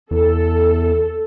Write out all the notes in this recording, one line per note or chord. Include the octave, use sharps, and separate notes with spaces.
E2 A4